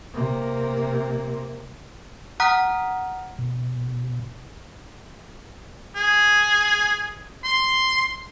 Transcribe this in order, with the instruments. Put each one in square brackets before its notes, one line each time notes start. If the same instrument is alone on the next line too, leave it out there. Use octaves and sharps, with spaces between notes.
[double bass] C3 A#3
[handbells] F#5 A#5 D#6 F6 F#6 B6
[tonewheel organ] B2
[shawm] G#4
C6